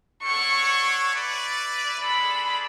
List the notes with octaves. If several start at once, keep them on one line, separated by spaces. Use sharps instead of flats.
D4 A4 C#5 F#5 C#6
E4 B4 D5
G#3 D4 A4 D5 B5